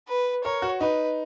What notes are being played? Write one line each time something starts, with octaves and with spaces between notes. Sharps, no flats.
B4
A#4 C#5
F#4
D#4 B4